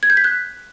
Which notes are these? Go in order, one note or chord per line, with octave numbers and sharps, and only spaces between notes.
G#6
G6
B6
F#6